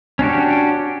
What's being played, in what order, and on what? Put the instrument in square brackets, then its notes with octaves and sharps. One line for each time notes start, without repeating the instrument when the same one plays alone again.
[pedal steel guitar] C#4 D4 F#4 G4